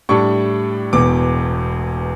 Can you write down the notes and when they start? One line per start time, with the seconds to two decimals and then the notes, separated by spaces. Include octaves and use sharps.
0.09 A2 G3 D4 C#6
0.93 E1 E2 B2 D6